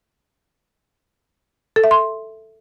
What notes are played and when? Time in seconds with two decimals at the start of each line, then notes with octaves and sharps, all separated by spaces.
1.76 A4
1.84 E5
1.91 C6